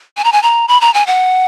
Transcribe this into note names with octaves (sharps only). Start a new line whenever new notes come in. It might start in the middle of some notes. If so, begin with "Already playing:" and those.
G#5
A#5
G#5
A#5
B5
A#5
G#5
F#5